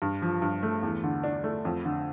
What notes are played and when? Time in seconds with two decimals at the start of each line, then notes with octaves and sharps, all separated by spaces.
0.02 G2
0.22 F3
0.42 G2
0.63 A3
0.83 E2
1.03 D3
1.24 D4
1.44 A3
1.65 F2
1.85 D3